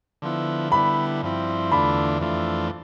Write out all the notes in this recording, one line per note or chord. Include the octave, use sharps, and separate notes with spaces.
D3 F3 B3 E4
D3 G3 B3 E4 B5
G2 F3 C4 E4
E2 D3 A3 D4 F4 B5
F2 E3 A3 D4 F4